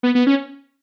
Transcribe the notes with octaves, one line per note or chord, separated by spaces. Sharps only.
B3
B3
C#4